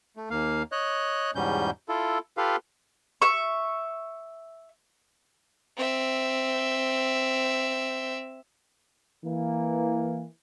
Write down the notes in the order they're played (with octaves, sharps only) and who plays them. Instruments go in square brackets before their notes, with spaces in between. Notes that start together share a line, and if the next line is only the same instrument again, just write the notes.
[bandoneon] A3
D#2 A#3 F5
C#5 D#5 F#6
E2 G#2 B2 G3 C#4 G6
E4 F4 A4
F4 G4 A4 B4 F5
[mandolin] E5 C#6
[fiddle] C4 E5
[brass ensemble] E3 A#3